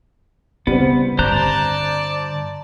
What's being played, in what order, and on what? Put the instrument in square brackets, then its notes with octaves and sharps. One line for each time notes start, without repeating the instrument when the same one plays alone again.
[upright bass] C#3 [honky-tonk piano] G3 C4 [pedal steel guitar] B3
[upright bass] G2 D3 [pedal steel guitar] C5 A#5 F#6 [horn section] D5 A5